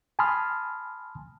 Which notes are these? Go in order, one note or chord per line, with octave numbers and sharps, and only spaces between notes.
G#5 A5 B5 C6 D#6 F6